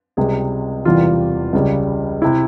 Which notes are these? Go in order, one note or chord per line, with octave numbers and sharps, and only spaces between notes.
C#2 C3 G3 G#4
E1 E2 C3 E3 G3 F4
C#2 C#3 G3
C3 E4